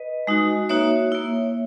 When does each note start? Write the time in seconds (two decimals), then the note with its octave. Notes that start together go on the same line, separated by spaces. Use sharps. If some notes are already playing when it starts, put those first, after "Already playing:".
Already playing: B4 D#5
0.27 G#3 D#4 F#4
0.69 A#3 D#4 F#4 C#5 E5
1.12 A#3 E4